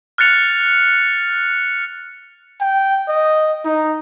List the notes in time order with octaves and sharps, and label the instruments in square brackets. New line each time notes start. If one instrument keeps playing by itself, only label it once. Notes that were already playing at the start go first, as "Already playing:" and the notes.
[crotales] F6 F#6 A6 C#7 F7
[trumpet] G5
D#5
D#4